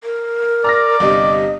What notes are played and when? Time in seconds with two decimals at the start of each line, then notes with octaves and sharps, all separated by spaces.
0.04 A#4
0.64 D5 A#5 F6 A#6
1.00 G1 C3 D#5 D#6